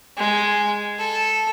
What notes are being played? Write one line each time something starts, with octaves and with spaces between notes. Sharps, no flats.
G#3
A4